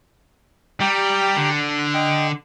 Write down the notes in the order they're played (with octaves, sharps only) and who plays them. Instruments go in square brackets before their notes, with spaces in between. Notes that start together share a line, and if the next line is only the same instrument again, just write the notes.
[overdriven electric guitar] G3 [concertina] G4 G5 A#5
[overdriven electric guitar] D3
[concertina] D#5 G5